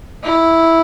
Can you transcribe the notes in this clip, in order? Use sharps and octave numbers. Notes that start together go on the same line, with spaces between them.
E4